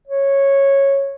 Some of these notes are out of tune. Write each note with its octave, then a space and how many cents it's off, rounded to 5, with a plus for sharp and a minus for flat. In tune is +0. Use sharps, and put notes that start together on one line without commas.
C#5 -10